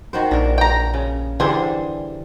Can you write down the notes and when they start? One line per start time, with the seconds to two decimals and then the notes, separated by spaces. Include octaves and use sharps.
0.13 D#3 F#4 C5
0.31 A#1 D4 A#4
0.58 G5 A#5
0.94 C#3
1.40 D3 E3 G3 D4 G#4 C5